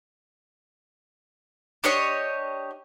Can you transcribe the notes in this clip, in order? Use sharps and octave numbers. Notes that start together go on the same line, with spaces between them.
D4 G4 C#5 D#5